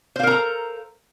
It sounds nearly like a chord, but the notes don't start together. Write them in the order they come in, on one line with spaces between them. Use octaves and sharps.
C5 F5 A#4 A#5 A4